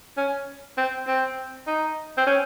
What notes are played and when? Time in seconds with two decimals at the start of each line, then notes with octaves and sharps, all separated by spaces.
0.17 C#4
0.78 C4
1.07 C4
1.67 D#4
2.18 C4
2.27 C#4